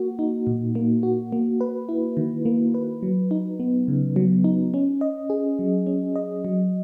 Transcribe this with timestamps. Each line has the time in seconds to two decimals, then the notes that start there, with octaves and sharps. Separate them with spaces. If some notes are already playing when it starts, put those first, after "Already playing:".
Already playing: A#3 F#4
0.19 D#4
0.47 A#2
0.75 A#3
1.03 F#4
1.32 A#3
1.61 B4
1.89 E4
2.17 D#3
2.45 A#3
2.74 B4
3.03 F#3
3.31 D#4
3.60 B3
3.88 C#3
4.16 F#3
4.44 D#4
4.74 C#4
5.01 D#5
5.30 G#4
5.59 F#3
5.87 C#4
6.16 D#5
6.45 F#3